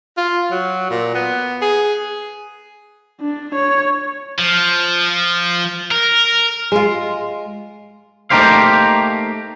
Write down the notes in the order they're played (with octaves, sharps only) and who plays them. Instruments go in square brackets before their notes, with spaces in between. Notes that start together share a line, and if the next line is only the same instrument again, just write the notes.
[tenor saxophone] F4
F#3
A#2
B3
G#4
[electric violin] D4
C#5
[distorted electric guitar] F3
A#4
[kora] G#3 F4
[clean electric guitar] A3 A#3 D#4 G4 C5 F5